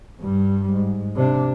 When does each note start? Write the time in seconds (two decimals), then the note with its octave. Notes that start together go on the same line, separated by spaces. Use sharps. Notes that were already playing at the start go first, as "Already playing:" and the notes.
0.20 G2 G3
0.73 G#2
1.16 C3 D4